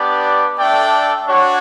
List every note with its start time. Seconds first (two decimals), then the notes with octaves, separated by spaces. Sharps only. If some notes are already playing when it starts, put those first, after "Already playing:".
Already playing: B3 D4 G4 D5
0.58 A3 D4 A4 D5 G5
1.25 D4 F#4 C#5